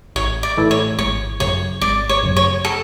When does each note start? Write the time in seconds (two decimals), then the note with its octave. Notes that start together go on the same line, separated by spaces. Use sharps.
0.15 A1 C#5
0.43 D5
0.57 A2 E3 A3 E4
0.71 C#5
0.98 G#1 C#5
1.40 F#2 C#3 C#5
1.81 G#1 D5
2.09 C#5
2.23 F#2 C#3
2.36 C#5
2.65 A4